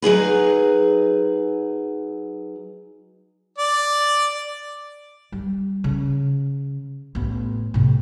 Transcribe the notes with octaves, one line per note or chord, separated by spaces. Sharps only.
F#3 D#4 G#4 B4
D5
G3
C#3
A1 B3
A2 C3